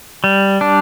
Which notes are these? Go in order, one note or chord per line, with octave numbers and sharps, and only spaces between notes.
G3
D4